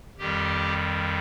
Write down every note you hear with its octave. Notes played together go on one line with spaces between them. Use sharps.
F2 D#3 G3 G4